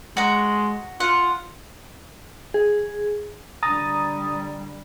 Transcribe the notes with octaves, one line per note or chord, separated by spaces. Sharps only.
G#3 F#4 A#5
F4 F#5
G#4
D3 G3 A#5 D#6 A6